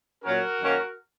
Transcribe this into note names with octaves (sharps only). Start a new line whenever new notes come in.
A#2 F#3 C#4 F#4 A#4
F#2 D#3 F#3 A#3 C#4